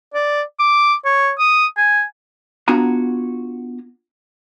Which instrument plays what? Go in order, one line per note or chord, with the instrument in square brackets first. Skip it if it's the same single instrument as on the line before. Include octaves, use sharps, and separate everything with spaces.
[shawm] D5
D6
C#5
D#6
G#5
[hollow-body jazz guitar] B3 D4 F4 F#4 G#5 A#5